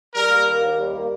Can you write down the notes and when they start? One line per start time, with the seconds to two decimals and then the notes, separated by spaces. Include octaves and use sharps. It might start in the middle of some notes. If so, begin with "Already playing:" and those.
0.15 G3 A#4
0.30 A#3
0.46 D#3
0.63 D#2
0.77 G3
0.94 A#3